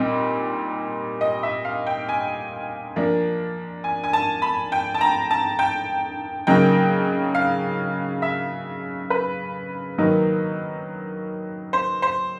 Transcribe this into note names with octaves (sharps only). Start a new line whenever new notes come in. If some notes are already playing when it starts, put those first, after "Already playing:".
Already playing: A#2 G3 C4 D#4
D#5
E5
F5
G5
G#5
F3 A#3 D4
G#5
G#5
A5
B5
G5
A5
A#5
A5
G5
C#3 F#3 A#3 D#4 G5
F5
E5
B4
D#3 F#3 A#3 D#4
C5
C5